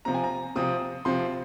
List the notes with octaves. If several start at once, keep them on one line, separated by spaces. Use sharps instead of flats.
C3 F3 C4 A#5
G#5
A#5
C3 F3 C4 D#6
C3 F3 C4 C6